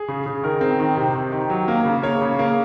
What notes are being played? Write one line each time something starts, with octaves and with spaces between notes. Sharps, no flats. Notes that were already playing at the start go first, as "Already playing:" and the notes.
Already playing: G#4
C#3
C#3
D#3 A#4
C4
D#3
C3 C5
D#3
D#3
F#3
A#3
C#3
A#3 C#5
C#3
A#3